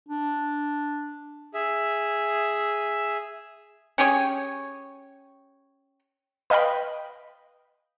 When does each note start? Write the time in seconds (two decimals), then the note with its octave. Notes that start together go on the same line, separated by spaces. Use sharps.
0.08 D4
1.54 G#4 E5
3.98 C#4 G4 G#4 C#5
6.50 B4 D#5 F5 G5 B5